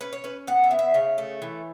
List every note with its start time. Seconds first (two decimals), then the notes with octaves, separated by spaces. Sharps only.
0.01 C#4 B4
0.13 C#5
0.24 C#4 B4
0.47 B3 F#5
0.64 E5
0.71 B3
0.79 E5
0.94 C#3 C#5
1.18 A3
1.42 E3